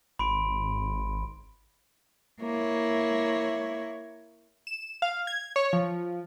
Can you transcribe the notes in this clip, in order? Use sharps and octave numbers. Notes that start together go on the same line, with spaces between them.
G#1 B5 C6 D7
A#3 E4 C#5
E7
F5
G#6
C#5
F3